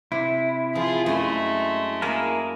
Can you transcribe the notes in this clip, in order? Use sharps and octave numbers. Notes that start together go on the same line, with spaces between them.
C3 E4
F3 F4 G#4
F#2 G#3 A3 G#5
A#3 E4 G#4 A#4 A5